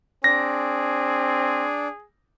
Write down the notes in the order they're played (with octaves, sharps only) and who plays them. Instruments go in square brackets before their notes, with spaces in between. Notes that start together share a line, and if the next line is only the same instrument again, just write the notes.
[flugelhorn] C4 [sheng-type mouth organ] D4 [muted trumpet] G#4 [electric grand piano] A#6